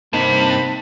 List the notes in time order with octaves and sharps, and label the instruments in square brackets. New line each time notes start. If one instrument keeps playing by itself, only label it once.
[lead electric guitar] G2 [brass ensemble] C3 C4 [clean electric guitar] A#3 D#4 [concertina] B5